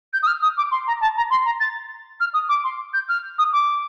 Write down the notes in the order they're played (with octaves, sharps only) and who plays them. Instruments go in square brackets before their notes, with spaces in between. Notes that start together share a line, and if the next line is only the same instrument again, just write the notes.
[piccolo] G6
D#6
F6
D#6
D6
C6
A#5
A5
A#5
C6
A#5
A6
F6
D#6
D6
C6
G6
F6
D#6
D6